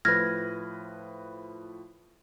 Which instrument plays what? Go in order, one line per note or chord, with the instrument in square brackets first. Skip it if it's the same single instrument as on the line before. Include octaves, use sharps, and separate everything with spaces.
[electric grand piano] A2 F3 B4 [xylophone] F6 G#6 A#6